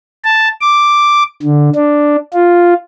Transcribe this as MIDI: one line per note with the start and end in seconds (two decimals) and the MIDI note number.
0.24 0.48 81
0.61 1.23 86
1.42 1.69 50
1.75 2.16 62
2.33 2.74 65